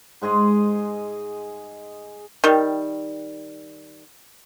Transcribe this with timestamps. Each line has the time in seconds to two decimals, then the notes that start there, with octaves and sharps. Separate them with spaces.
0.22 G#2 G#3 G#4 D#5
2.44 D#3 G3